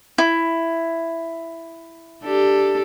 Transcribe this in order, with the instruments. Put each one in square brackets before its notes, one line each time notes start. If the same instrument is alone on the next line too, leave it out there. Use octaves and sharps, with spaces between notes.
[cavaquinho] E4
[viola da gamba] D4 G4 A4